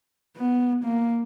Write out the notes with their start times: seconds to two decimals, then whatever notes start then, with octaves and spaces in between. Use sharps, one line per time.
0.36 B3
0.84 A#3